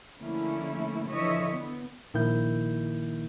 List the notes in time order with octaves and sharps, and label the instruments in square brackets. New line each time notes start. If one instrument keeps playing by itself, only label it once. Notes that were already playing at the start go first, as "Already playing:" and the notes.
[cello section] D3 F3 A3 A#3 C#4 E4
D3 E3 F3 C#5 D#5 E5
B3
[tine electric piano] A#1 D#3 A#3 E4 G6